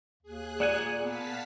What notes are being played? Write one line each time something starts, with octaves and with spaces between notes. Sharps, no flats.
D#2 G#4 F#6
A#2 D5 F#5 G#5
B3 F5 A5 B6